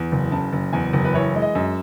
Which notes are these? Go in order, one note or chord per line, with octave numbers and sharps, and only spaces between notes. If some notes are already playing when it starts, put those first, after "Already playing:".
Already playing: E2
F#1
C#3 A5
F#1
E2 G#5
F#1
B4
E3 C#5
G#3
D#5
F#2